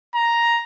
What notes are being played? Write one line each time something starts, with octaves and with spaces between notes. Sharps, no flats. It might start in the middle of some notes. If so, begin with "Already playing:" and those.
A#5